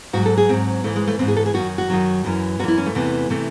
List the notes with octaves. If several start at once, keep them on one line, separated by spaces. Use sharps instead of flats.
G#2 F#3 F#4
A4
G#4
G#2 F#3 C4
G#2 E3 A3
G#3
A3
G#2 E3 C4
G#4
A4
G#4
F#2 D#3 F#3 F#4
F#4
F#2 D#3 F#3
F#2 E3
F#2 E3 E4 F#4
C#4
A3
E2 C3 E3
C3 E3 A3